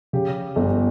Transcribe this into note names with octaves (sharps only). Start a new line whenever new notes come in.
C#3 G4
G1